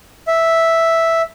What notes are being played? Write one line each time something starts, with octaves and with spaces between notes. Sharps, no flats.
E5